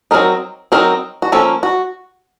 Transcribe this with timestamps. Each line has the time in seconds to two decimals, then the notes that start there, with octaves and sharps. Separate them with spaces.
0.11 F#3 C4 D#4 A#4
0.72 F#3 C4 D#4 A#4
1.22 F#4
1.32 F3 A#3 C#4 A4
1.63 F#4